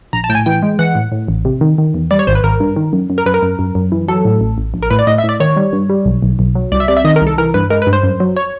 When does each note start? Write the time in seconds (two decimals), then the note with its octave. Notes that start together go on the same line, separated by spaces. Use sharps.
0.13 A#1 A#5
0.24 A5
0.29 A2 G5
0.35 G#5
0.46 E3 G5
0.63 G#3
0.79 E3 F#5
0.95 A2
1.12 A2
1.28 A1
1.45 C3
1.61 D#3
1.78 D#3
1.94 E2
2.11 G3 D5
2.19 C#5
2.27 G#1 C5
2.35 B4
2.44 G#1 A#4
2.60 G2
2.76 D#3
2.93 F#2
3.10 F#2
3.18 A#4
3.26 F#2 B4
3.34 A#4
3.43 F#2
3.59 F#2
3.75 F#2
3.92 E3
4.08 F#3 A4
4.25 A2
4.41 A1
4.58 A1
4.74 A#1
4.83 A#4
4.90 A2 B4
4.99 D5
5.07 A2 D#5
5.18 E5
5.24 A2
5.29 D5
5.40 D#3 C#5
5.56 G3
5.73 G2
5.90 G3
6.06 B1
6.23 B1
6.39 B1
6.55 F#3
6.72 C2 D5
6.80 E5
6.88 C3 D5
6.97 E5
7.05 D#3 D#5
7.16 A#4
7.21 C2
7.27 A4
7.38 E3 A#4
7.54 G2 B4
7.70 G#3 A#4
7.82 B4
7.87 G2
7.93 C5
8.04 F#2
8.20 F#3
8.36 C#5